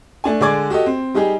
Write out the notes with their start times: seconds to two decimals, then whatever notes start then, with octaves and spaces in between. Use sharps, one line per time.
0.24 A3 D4 G#5
0.41 D3 G#3 G#4 D5 D6 G#6
0.70 F#4 G4 A4 D#5
0.86 C4
1.14 G3 D#4 G4 G#4